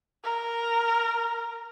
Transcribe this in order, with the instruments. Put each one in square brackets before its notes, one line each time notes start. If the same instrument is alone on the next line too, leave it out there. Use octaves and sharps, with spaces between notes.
[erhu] A#4